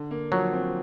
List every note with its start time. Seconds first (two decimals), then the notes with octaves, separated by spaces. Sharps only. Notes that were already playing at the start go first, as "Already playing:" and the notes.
Already playing: D3
0.11 A#3
0.31 F3 F#3
0.53 C4